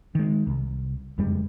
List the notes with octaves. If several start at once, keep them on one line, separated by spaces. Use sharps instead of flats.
D#3 G#3
C2
F#1 F2 G3 G#3